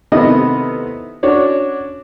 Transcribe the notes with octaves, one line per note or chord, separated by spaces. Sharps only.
C3 D#3 A3 B3 E4 D#5
C#4 D4 F#4 C#5 D5